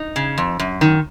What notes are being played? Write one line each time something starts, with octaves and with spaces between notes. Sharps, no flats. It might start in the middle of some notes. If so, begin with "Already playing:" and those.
Already playing: D#4
C#3
F2
F#2
D#3